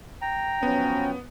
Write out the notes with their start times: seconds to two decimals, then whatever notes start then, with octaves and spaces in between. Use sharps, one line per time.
0.21 G5 A#5
0.63 F3 F#3 B3 C#4